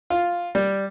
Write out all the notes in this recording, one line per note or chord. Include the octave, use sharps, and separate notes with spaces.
F4
G3